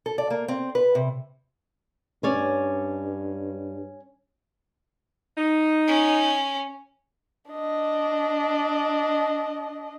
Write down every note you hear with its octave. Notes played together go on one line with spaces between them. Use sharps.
A4
D5
A#3
C4
B4
C3
G2 C#4 C#5 D5
D#4
C#4
D4 D#5